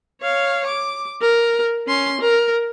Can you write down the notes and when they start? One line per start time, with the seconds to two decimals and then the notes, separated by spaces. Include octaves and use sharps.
0.22 C#5 F5
0.66 D6
1.21 A#4
1.87 C#4 C6
2.21 A#4